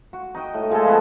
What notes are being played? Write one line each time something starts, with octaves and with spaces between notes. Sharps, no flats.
F#4
D#4 F#4 D#5 G5
A2
A#2 G#3 G#4 A4
F3 A3 B3